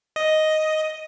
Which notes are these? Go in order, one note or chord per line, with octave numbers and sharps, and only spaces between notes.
D#5